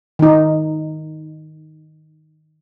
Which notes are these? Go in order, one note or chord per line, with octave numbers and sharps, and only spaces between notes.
D#3 D#4